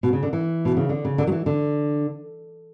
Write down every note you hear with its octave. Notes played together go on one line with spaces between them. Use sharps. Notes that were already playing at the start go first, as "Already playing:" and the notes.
B2
C#3
D3
E3
B2
C#3
D3
C#3
D3
F#3
E3
D3